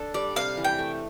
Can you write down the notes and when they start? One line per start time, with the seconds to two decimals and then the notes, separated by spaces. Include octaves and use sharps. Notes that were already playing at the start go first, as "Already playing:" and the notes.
Already playing: D4 A4
0.14 G3 D5
0.36 C3 F5
0.57 E3
0.64 G5
0.79 A3